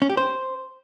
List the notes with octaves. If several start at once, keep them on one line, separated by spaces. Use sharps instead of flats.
C#4
G4
C5